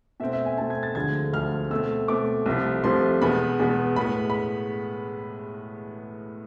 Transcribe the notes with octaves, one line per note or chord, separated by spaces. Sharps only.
B2 A3 C4 E5
E5
G#5
B2 A3 C4 A5
G#6
A6
D2 D3 F3 G#3 G#6
D2 D3 F3 G#3 F6
B2 A3 C4 E6
B2 A3 C4 D6
C2 C3 F3 A3
C2 C3 F3 A3 C6
E2 B2 G#3 B3 B5
E2 B2 G#3 B3
A2 G#3 B3 B5
B5